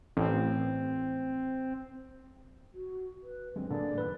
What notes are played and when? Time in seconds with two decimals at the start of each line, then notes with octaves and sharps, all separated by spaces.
0.17 A1 C4
2.74 F#4
3.23 B4
3.56 G2 D3 F#3 G#3 C4
3.70 A2 D3 A#3 G#4 D5
3.98 F#2 D#3 D4 B4